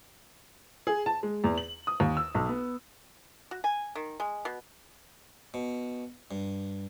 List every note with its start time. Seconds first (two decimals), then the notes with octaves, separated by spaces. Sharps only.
0.87 G#4
1.06 A5
1.23 G#3
1.44 E2
1.58 F#7
1.87 D#6
2.00 D#2
2.17 E6
2.35 B1
2.49 B3
3.51 F#4
3.64 G#5
3.95 D#3
4.20 G#3
4.45 B2
5.54 B2
6.31 G2